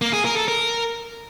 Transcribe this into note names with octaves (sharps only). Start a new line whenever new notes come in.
A#3
G#4
A#4
A4
A#4